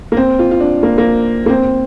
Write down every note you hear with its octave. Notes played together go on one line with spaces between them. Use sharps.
A#3
C4
F4
F4
D4
A#3
A#3
A#3
C4